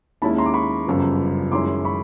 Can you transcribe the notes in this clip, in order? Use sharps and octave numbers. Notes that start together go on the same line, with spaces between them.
D#2 D#3 G#3 C#4 E4 A5 B5
A#5 C6
D6
B5 C#6
G1 F#2 C#3 F3
F#2 D#3 G#3 C#4 E4 C6 D6
B5 C#6